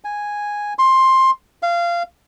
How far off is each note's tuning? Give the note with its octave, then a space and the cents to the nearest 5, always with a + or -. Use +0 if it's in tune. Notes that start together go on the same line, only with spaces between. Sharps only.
G#5 -5
C6 +15
F5 -20